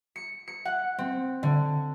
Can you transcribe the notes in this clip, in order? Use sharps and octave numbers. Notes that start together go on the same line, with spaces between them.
C#7
C#7
F#5
C4
D3